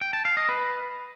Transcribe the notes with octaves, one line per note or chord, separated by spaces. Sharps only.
G5
A5
F5
D#5
B4